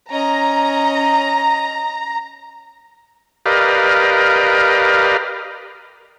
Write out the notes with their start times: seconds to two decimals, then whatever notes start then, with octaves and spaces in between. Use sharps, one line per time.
0.11 C#4 D#5 A#5
3.46 G4 A#4 B4 D5 D#5 F5